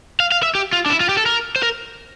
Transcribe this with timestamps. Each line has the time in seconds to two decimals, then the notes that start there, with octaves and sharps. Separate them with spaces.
0.20 F5
0.32 F5
0.43 E5
0.55 G4
0.73 F4
0.86 D4
0.90 E4
1.00 F4
1.09 G4
1.17 A4
1.26 A#4
1.56 C5
1.63 A#4